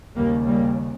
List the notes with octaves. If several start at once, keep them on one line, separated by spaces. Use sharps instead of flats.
D#2 C#3 G3 A#3
G3 A#3